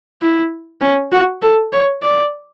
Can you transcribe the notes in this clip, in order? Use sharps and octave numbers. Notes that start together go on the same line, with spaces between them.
E4
C#4
F#4
A4
C#5
D5